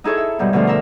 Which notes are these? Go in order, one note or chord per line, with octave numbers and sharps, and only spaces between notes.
D#4 E4 G#4 A4 C#5
E5
G#2 B2 G3 E4
B2 D3 F3 A3 F4
A#4 E5